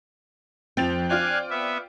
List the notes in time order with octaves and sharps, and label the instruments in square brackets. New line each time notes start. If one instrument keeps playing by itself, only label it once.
[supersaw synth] F2 F3 F#6 [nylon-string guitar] C4 [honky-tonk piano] G5 A6 F7
[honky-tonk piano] F4 D5 G5 [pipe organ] F5 G#5 F#6 [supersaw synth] D7
[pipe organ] B3 E5